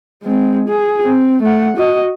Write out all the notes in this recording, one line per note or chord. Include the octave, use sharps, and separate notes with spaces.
G#3 C4
G#4
C4
A3 F#5
F#4 D#5